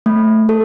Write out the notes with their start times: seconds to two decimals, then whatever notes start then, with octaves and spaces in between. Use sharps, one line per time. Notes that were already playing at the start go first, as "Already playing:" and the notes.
0.06 A3
0.49 A4